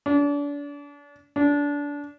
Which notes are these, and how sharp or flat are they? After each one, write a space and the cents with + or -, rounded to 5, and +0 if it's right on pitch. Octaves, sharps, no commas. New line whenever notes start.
D4 -35
D4 -25